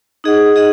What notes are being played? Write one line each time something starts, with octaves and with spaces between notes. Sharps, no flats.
D#4 G#4 D#5 F#5
D#4 G#4 D#5 F#5